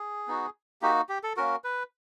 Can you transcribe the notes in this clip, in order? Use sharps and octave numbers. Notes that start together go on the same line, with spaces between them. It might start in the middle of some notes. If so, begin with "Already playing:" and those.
Already playing: G#4
B3 D#4 F#4
A#3 D#4 F#4 G4
G4
A4
A#3 C#4 F#4 A#4
B4